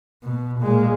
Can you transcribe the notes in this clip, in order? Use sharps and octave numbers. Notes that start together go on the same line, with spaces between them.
B2
A#2 G#3